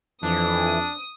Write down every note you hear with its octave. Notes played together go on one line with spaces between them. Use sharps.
F2 E3 D4 D#6